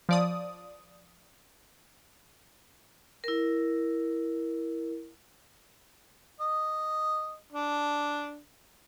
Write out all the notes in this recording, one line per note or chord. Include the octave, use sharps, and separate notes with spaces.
F3 D5 D#6
E4 A#4
D#5
D4